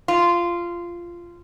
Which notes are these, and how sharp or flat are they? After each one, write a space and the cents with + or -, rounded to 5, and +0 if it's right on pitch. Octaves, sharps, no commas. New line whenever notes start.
F4 -15